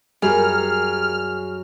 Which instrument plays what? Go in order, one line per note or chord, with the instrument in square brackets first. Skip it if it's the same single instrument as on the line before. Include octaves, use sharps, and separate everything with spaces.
[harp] F#2 [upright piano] G3 [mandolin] G#4 [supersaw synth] F6